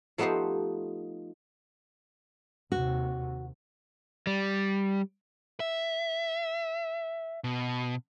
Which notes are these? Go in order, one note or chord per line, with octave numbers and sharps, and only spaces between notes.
F3 A3 B3 D#4 G4 C5
D#2 C3 F#4
G3
E5
B2